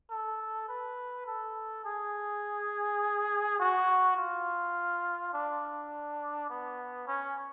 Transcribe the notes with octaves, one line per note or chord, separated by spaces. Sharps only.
A4
B4
A4
G#4
F#4
F4
D4
B3
C#4